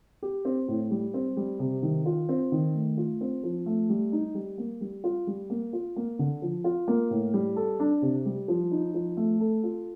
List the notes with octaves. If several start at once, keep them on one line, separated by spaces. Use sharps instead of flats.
G4
C4
A2
G3
C4
G3
C3
D#3
F4
C4
D#3
A3
F4
C4
F3
A3
G3
D#4
G3
A#3
G3
F4
G3
A#3
F4
A#3
D3
F3
F4
A#3
A2
G3
A4
D4
C3
G3
F3
D#4
F3
A3
A4
F4